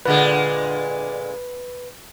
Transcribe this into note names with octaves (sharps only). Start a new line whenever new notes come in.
A#2 D3 G#3 B4